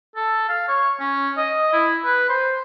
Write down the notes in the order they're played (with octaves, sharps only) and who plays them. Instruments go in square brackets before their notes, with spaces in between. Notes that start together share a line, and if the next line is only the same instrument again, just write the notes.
[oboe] A4
F5
C#5
C#4
D#5
E4
B4
C5